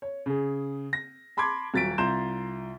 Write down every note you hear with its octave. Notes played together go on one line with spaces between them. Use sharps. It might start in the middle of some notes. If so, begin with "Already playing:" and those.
C#5
C#3 G#4
A#6
A5 B5 C6 D6 G#6
D#1 F#3 A6 B6 D7
C2 F4 A#5 C6 G6 E7